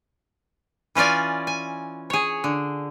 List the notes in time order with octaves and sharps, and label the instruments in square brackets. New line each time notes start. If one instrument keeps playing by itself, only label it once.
[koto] E3 C#4 F4 D5 G#5
G#5
G#4 C#5
D3